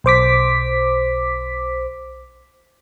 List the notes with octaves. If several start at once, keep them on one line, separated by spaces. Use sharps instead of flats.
B1 C5 D6 B6